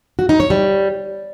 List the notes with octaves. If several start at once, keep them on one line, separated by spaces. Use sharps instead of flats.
F#4
D#4
C#5
G3